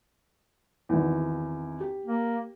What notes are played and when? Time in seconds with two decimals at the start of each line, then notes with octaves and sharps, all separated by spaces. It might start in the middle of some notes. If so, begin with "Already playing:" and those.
0.89 G#1 E2
1.80 G4
2.06 A#3